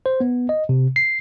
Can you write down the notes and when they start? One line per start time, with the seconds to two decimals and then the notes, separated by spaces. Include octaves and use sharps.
0.06 C5
0.20 B3
0.49 D#5
0.69 C3
0.96 C7